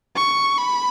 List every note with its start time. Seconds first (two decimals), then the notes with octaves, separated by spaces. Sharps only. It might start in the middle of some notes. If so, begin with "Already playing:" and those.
0.16 C#6
0.58 B5